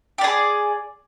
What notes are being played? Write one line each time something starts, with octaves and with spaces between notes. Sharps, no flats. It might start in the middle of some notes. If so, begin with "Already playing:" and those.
G4 G#4 D5